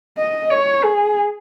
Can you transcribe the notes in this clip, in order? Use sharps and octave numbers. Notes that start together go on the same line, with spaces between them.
D#5
C#5
G#4